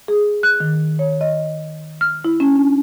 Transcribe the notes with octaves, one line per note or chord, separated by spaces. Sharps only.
G#4
F#6
D#3
C#5
D#5
F6
E4
C#4
D4